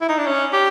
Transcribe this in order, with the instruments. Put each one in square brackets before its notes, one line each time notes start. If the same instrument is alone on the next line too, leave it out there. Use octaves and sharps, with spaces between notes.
[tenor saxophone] E4
D#4
D4
C#4
G4